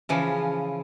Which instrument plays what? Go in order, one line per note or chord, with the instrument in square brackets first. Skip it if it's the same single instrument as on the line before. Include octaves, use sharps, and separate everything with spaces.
[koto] C#3 E3 F3